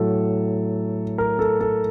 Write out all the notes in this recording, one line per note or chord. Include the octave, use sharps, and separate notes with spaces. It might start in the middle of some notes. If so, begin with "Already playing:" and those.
Already playing: A2 F#3 A4
A#4
A4
A4